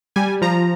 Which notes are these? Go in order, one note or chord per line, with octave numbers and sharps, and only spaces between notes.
G3 G#5
F3 A#5